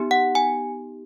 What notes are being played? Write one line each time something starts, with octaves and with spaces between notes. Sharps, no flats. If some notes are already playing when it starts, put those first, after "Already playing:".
Already playing: B3 D#4 G4
F#5
G#5